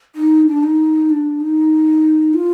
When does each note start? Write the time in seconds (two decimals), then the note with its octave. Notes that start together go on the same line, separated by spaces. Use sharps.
0.15 D#4
0.47 D4
0.63 D#4
1.10 D4
1.40 D#4
2.34 F4